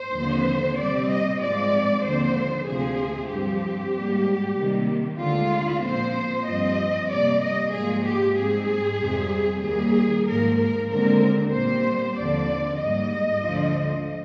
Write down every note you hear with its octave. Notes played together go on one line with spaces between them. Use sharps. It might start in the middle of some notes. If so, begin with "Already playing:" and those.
Already playing: C5
D#2 D3 F3 C4
C3 G3 C4 D5
D#5
G#2 F3 G#3 C4 D5
D#2 D3 F3 C4 C5
D2 C3 F3 C4 G#4
G2 F3 C4 G4
G#2 G3 A#3
C3 D#3 G3 A#3
D2 D3 G#3 F4
A#2 F3 C4 C5
G2 F3 C4 D#5
C3 G3 A#3 D5
D#5
G#2 F3 A#3 G#4
G4
G#2 G3 C4 G#4
F2 C3 G3 C4
D#2 D#3 G3 A#3 G#4
G#2 F3 A#3 A#4
A#4
D#2 D3 G#3 C4 A#4
A#2 G3 C4 C5
D#2 D3 F3 C4 D5
G#2 G3 A#3 D#5
D2 D3 F3